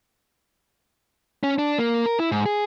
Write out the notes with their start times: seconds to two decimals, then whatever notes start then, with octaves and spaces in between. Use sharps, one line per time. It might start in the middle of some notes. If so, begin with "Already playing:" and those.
1.43 C#4
1.58 D4
1.78 A#3
2.06 A#4
2.20 E4
2.31 G#2
2.46 G#4